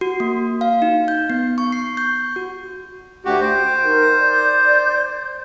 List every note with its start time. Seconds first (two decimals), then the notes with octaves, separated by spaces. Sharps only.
0.01 F#4
0.20 A#3
0.61 F5
0.82 D#4
1.08 G6
1.30 B3
1.58 C#6
1.72 C7
1.97 G6
2.36 F#4
3.25 D2 D4 F#4 G4
3.40 C5 G5
3.84 D#4 A#4
4.20 D5 G6